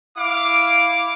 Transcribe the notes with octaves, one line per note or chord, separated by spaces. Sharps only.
E4 F5 D6